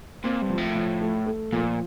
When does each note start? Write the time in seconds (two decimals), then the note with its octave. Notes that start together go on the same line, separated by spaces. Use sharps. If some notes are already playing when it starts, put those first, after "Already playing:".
0.24 A#2 C4
0.42 G2
0.50 F3
0.58 A2
0.75 F3
1.01 A3
1.26 A3
1.52 A#2 F3